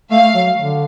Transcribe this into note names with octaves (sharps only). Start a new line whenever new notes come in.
A3 F5
F#3
D3